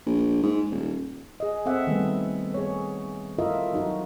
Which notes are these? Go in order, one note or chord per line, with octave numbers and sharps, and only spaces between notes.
A#1
G#2
D#1
G#4 D#5
C4 A4 E5 F#5
D#3 G3 A3 B3
G#4 C#5
E4 F4 A4 A#4 D#5 E5
F#3 D#4 F#4